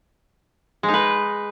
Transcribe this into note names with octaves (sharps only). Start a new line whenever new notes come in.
G#3
D#4
B4